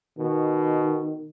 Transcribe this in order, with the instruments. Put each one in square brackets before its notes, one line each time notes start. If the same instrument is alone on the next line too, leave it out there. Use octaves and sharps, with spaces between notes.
[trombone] B2 [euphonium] D#3